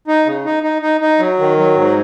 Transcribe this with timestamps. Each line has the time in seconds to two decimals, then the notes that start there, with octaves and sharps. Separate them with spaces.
0.08 D#4
0.26 C#3
0.45 D#4
0.63 D#4
0.82 D#4
1.01 D#4
1.19 F#3
1.39 D#3
1.58 F#3
1.76 G#2